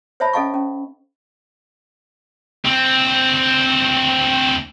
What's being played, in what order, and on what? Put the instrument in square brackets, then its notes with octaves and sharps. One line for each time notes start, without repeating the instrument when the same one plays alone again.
[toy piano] C5 C#5 E5 A5 B5
C#4 A4 D#5 F5 A5 C#6
C#4
[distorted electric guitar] D2 C4